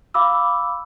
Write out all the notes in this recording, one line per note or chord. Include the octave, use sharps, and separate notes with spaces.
F5 B5 D6 E6